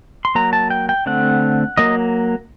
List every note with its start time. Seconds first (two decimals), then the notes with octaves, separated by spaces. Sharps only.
0.25 C6
0.35 F#3 A#3 A#5
0.53 A5
0.70 G5
0.89 G5
1.06 D3 A3 C4 F#5
1.77 F#3 A#3 D#5